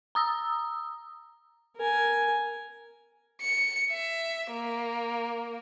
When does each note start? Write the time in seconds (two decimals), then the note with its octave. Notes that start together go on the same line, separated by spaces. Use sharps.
0.15 A#5 D#6 E6
1.76 A#4 G#5
3.42 C#7
3.92 E5
4.53 A#3